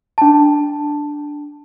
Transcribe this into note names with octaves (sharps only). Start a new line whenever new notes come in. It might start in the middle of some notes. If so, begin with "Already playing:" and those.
D4 A5